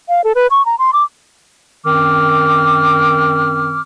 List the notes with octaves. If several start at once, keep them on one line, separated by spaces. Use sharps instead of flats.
F5
A4
B4
C#6
A#5
C6
D6
F#2 D#3 C4 D6 F6